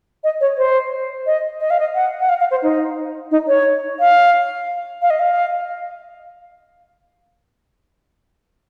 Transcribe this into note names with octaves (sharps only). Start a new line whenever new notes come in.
D#5
C#5
C5
D#5
D#5
F5
D#5
F#5
F#5
F5
F5
C5
D#4
D#4
C#5
F5
F5
D#5
F5